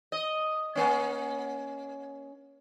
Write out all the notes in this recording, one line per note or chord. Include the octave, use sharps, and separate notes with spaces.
D#5
A#3 C#4